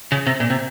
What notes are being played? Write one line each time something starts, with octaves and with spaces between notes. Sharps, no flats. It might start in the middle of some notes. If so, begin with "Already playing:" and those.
C#3
C3
A#2
C3